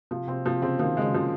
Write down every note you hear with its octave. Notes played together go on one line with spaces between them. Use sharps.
C3 F3
C3 C4
C3 F3
C#3 C4
D#3 F3
C#3 G#3
F3